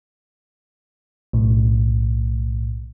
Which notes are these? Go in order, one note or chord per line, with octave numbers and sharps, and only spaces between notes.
B1 A2